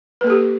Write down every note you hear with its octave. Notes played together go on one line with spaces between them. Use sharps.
A#3 G4 A4 B4